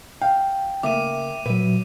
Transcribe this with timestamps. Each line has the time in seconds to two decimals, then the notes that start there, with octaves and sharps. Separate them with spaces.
0.22 F5 G5
0.83 C#3 A3 A#3 E5 D6 D#7
1.46 A#2 F#3 B4 E5